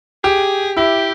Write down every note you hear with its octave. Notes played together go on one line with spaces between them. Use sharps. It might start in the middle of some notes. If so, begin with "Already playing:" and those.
G4 G#4
E4 G4